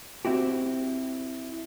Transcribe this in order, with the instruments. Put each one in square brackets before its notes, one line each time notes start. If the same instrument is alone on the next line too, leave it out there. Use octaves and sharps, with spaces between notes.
[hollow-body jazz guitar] C4 E4 F#4 G4